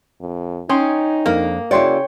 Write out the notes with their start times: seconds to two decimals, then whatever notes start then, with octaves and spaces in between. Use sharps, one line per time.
0.21 F2
0.69 C#4 D#4 G5 C6 D#6
1.26 F2 A#3 D4 A#4
1.71 C#3 E4 F#4 C#5 D5 G5 C6